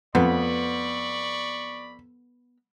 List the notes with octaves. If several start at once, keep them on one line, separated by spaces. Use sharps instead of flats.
F2 B3 D5 B5 C#6